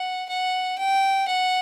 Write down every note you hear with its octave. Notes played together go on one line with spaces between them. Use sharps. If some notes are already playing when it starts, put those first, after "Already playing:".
Already playing: F#5
F#5
G5
F#5